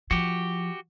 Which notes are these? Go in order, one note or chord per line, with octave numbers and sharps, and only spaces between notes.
F3 F#4 G4